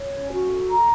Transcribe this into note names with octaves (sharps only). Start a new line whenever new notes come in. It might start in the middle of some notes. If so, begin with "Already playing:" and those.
Already playing: C#5
C#4
F#4
A4
A#5